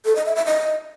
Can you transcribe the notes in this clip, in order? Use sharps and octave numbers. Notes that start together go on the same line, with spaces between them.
A4
D#5
E5
E5
D#5